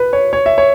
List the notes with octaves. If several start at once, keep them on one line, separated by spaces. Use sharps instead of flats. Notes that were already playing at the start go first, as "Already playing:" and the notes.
Already playing: B4
C#5
C#5
E5
C#5